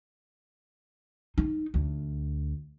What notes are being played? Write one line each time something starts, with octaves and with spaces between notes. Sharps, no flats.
D#4
D2